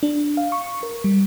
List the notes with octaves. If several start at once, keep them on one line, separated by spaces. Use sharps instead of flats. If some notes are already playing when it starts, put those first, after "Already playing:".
D4
F5
C#6
A#4
G3